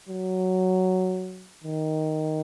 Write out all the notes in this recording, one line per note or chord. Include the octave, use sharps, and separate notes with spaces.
F#3
D#3